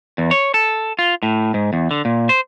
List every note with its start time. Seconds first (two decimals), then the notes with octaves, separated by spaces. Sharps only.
0.18 E2
0.31 C#5
0.54 A4
0.99 F4
1.23 A2
1.54 G#2
1.73 E2
1.91 D3
2.05 A#2
2.29 C5